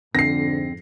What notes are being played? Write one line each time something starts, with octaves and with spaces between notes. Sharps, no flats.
F2 G#2 D3 C4 A#6 C7